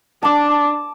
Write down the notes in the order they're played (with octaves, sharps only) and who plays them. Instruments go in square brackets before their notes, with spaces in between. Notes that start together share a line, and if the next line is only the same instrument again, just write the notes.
[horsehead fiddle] D4 [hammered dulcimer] A5 D6